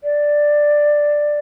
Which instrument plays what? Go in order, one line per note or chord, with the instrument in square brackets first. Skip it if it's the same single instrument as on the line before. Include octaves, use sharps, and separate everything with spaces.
[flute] D5